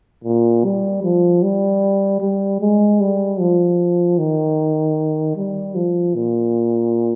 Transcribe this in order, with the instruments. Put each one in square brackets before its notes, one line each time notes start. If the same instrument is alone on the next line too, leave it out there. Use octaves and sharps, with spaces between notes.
[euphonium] A#2
G3
F3
G3
G3
G#3
G3
F3
D#3
G3
F3
A#2